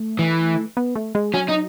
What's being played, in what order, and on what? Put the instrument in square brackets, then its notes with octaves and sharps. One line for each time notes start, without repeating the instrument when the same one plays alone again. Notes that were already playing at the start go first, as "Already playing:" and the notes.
Already playing: [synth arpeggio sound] A3
[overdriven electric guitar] E3
[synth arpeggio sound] B3
A3
G#3
[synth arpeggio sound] F#3 [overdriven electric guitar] C#4
[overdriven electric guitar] D#4